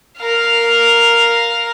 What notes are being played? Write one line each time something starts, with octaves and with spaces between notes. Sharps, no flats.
A#4 F5